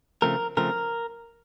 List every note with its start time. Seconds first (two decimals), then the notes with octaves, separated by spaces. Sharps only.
0.22 C#3 F3 A3 C4 A#4
0.57 C#3 F3 A3 C4 A#4